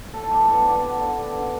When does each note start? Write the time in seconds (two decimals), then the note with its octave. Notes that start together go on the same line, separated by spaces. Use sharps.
0.13 A2 A4
0.24 A4
0.30 G3 G4
0.40 B4
0.47 B3 A4
0.65 D3 D5
0.82 B3
0.99 D3
1.17 D3
1.34 D3